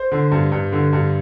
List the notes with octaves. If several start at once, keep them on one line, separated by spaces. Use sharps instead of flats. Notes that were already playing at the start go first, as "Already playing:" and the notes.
Already playing: C5
D3
G2
G2
D3
G2